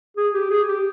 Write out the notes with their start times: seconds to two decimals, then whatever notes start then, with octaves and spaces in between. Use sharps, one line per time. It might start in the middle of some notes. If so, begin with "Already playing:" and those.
0.17 G#4
0.34 G4
0.50 G#4
0.68 G4